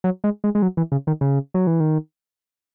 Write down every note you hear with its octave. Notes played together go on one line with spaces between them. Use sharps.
F#3
G#3
G#3
G#3
F#3
E3
C#3
D#3
C#3
F#3
E3
D#3